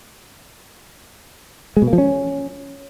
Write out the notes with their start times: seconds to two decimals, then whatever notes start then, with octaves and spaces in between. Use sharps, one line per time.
1.77 G#3
1.82 B2
1.87 A#3
1.93 F3
1.98 C#4